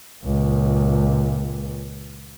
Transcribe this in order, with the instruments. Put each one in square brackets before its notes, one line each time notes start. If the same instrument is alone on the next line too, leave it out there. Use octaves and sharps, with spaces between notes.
[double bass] C#2 A#2